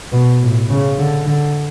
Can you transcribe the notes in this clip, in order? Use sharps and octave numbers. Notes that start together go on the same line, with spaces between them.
B2
A2
C#3
D3
D3